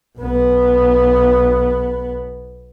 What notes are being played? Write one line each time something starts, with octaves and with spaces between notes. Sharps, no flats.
B1 B3